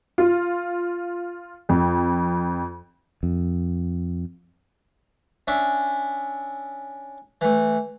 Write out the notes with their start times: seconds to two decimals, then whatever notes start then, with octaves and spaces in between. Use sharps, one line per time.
0.18 F4
1.69 F2
3.23 F2
5.47 C#4 D4 E5
7.41 E3 A3